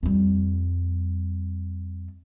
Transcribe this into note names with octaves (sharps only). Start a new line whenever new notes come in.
F2 G3